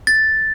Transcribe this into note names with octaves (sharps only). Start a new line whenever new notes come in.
A6